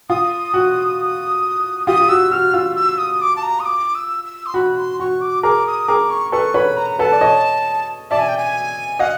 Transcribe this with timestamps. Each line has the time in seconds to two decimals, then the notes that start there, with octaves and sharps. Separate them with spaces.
0.10 F4 D#6
0.54 F#4
1.87 F4 G4 D#6
2.01 F4
2.09 F#4 E6
2.31 F#4 F6
2.54 F4 E6
2.76 E6
2.98 D#6
3.21 D6
3.36 A5
3.43 A#5
3.60 D#6
3.65 D6
3.95 E6
4.24 E6
4.46 C6
4.54 F#4 B5
4.77 C6
4.99 F#4 C#6
5.21 D6
5.43 G#4 A#4 D6
5.66 D#6
5.88 G#4 A#4 D6
6.10 C#6
6.32 A4 B4 C#6
6.54 B4 C#5 B5
6.77 A#5
6.99 A4 B4 A5
7.12 D5
7.21 C#5 D#5
8.10 D5 E5 A5
8.19 G#5
8.29 G5
8.38 G#5
8.99 D#5 F5 F#5